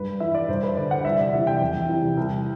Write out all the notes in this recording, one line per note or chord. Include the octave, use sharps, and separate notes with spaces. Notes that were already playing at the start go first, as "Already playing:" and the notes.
Already playing: G2 B4
E3 E5
D5
G2 C5
B4
D3 D5
F#5
C2 E5
D5
C3 E3 E5
G5
E2
C3 E3
C2